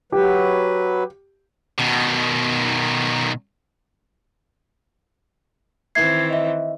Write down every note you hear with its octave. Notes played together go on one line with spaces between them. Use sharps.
F#3 G4 B4
B2 D#3
D#3 E3 C4 E5 G#6 C7
D#5 E5